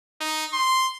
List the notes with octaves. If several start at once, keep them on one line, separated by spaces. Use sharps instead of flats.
D#4
C6